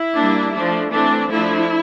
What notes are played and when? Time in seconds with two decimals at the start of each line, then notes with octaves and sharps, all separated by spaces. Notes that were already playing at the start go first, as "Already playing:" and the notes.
Already playing: E4
0.15 G3 A#3 D4
0.53 F3 A3 D4
0.90 E3 A3 C4 D4
1.29 F3 A3 D4 E4